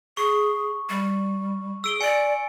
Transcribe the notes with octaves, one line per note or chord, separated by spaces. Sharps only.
G#4 C#6
G3
G#4 E6 D7 G7
D5 G#5 C#7